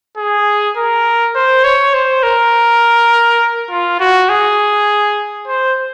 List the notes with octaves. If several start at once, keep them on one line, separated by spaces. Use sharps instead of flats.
G#4
A#4
C5
C#5
C5
A#4
F4
F#4
G#4
C5